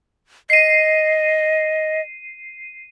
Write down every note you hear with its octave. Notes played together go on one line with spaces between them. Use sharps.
D#5 C7 D#7